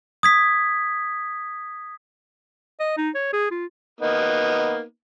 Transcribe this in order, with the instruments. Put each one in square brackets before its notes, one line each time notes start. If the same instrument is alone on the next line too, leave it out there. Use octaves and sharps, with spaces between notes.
[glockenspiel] D#6 G#6 B6
[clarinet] D#5
D#4
C#5
G#4
F4
[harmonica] A#3 B3 D#4